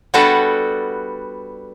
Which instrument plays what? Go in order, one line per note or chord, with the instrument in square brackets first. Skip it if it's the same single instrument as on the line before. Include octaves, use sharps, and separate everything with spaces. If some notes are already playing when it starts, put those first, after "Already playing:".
[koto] G3 B3 D4 F#4 A4 B4